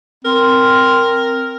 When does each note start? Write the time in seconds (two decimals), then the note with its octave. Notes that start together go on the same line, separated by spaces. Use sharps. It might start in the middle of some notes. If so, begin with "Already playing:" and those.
0.25 C4 A#4